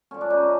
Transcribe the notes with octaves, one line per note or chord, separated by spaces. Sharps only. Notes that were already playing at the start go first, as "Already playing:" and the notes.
D3 F3 C#4
D4
C#3 D#4